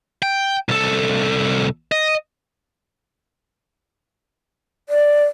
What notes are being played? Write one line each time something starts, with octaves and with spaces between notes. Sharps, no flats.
G5
C2 A4
D#5
D5